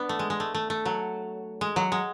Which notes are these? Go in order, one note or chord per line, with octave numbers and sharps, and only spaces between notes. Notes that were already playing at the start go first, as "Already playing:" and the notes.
Already playing: B3 D4
A3
G#3
G#3
A3
A3
A3
F#3
G#3
F#3
G#3